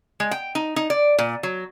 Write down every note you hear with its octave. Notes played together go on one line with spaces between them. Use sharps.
G#3
G5
D#4
D#4
D5
A#2
F#3